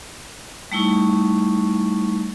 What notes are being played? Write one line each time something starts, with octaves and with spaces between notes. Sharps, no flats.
G3 A3 D#4 E4 C#6